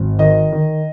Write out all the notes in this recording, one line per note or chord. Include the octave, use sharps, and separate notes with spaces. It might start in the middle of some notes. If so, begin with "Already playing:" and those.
Already playing: G#1
D#3 D#5
D#3